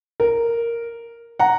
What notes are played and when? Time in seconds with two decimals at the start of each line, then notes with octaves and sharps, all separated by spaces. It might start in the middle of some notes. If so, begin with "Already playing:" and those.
0.20 A#4
1.39 F#5 A#5